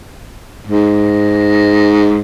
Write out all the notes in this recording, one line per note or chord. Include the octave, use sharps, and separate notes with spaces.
G#2